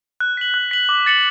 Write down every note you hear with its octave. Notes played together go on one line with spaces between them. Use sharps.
F#6
B6 F#7
F#6
B6 F#7
D6
A6 C#7 F#7